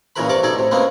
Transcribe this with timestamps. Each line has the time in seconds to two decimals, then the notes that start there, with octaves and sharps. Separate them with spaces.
0.16 A#2 C#3 E3 A#4 B4 B5
0.28 G2 C3 A#4 D5 C#6 D6
0.43 B1 D#4 G#4 A4 D5
0.55 A2 C3
0.71 C#3 G#3 A#3 C4 B4